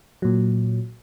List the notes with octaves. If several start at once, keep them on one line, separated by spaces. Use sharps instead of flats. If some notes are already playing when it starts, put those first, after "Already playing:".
A#2 F#3